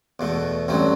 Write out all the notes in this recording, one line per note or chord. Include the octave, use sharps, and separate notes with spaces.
E2 B2 A3
A1 G2 F#3 A3 C4